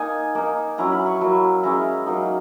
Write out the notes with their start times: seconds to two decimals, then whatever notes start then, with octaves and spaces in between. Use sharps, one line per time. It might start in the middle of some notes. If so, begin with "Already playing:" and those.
Already playing: A#3 D#4 G#5
0.35 A#3 D#4
0.78 F#3 C#4 E4 A#5
0.92 B5
1.06 C#6
1.21 F#3 A#3 E4
1.63 G#3 C#4 E4 A#5
2.06 F#3 A#3 D#4